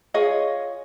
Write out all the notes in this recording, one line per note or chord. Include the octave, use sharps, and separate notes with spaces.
F4 G#4 C#5 D#5